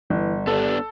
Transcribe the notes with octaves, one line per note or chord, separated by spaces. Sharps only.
G1 E3
G2 B3 D4 A4